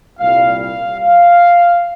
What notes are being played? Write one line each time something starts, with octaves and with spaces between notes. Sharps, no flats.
C2 A#2 G3 F5
F5
F5